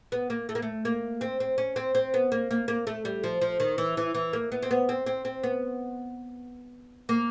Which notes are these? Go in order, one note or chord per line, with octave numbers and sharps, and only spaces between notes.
B3
A#3
A3
A#3
A3
A#3
C4
C4
C#4
C4
C4
B3
A#3
A#3
A#3
A3
G3
F3
F3
D#3
E3
E3
E3
A#3
B3
C4
B3
C4
C4
C4
B3
A#3